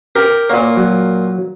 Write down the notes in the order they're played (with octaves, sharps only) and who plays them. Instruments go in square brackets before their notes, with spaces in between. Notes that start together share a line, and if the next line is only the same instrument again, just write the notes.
[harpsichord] G4 A#4
[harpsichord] A#2 A#3 [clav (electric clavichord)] C#5 D5
[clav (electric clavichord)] F#3